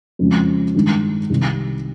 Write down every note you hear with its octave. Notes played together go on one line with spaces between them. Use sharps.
F2 C#3 F3 G#3 C#4
G2 D#3 G#3 D#4
C2 C3 D#3